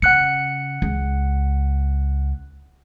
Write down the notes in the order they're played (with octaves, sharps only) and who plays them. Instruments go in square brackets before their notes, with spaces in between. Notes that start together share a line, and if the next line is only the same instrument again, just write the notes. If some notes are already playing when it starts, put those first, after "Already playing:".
[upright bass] C#3 [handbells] F#5 F#6 C#7
[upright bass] C#2